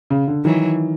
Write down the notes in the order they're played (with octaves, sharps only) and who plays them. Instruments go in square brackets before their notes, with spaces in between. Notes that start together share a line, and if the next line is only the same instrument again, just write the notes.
[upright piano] C#3
D3
[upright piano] D#3 [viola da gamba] E3 F#3